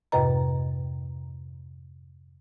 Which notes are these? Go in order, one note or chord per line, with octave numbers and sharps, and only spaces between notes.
F2 G#2 C3 B4 D#5 A#5